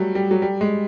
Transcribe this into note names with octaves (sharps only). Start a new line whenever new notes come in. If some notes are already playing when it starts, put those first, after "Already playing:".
Already playing: F#3 G3 A3
G3
F#3
G3
G#3